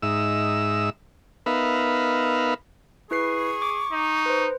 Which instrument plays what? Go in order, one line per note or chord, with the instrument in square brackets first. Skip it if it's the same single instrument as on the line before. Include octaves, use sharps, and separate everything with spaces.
[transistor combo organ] G#2 D#4 E5 E6
B3 D#4 A#4 B4 E5 F5
[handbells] E4 B4 C7 [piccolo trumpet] G#4 [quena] C#6
[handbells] D6
[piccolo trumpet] D#4
[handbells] B4 C5